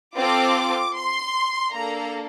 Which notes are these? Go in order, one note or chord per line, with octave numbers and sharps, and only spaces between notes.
C4 F4 A4 D6
C6
A#3 D4 A4 A#5